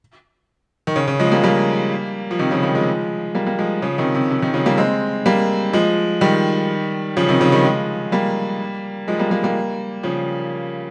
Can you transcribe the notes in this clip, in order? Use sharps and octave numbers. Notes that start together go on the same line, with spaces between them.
D#3
C#3
C#3
F3 G#3
G3 A#3
G3 A#3
F3
C3 D#3
C#3 F3
D#3 G3
F3 G#3
G3 A#3
G3 A#3
F3 G#3
C#3 F3
C3 D#3
C3
C3
C3 D#3
C#3 F3
G3 A#3
G#3 C4
G3 A#3
F3 G#3
D#3 G3
C#3 F3
C3 D#3
C#3 F3
D#3 G3
F3 G#3
G3 A#3
F3 G#3
G3 A#3
G3 A#3
G3 A#3
C#3 F3